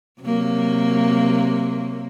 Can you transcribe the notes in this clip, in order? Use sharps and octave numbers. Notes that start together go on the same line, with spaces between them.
C3 F#3 A#3